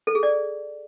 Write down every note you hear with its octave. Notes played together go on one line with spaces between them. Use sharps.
A4
G#4
D5